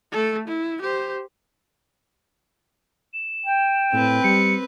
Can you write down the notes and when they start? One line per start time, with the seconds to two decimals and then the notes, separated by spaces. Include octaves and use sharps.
0.12 A3 A4
0.48 E4
0.82 G4 C5
3.14 E7
3.46 G5
3.93 A2 C4 B4
4.24 G3 C#7